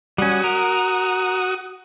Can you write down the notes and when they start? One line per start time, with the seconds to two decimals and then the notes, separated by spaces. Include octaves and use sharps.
0.18 G3 C#4 F#4 D#6
0.44 A#4